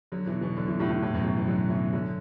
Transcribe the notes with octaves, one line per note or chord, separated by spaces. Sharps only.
D3 F#3
B2 E3
B2 E3
D3 F#3
B2 E3
A2 D3
A2
A2
F#2 B2
B2 E3
B2 E3
D3 F#3
B2 E3
D3 F#3